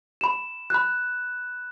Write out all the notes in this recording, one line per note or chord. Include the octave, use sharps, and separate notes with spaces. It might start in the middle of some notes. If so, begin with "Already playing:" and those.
B5 E7
B5 F#6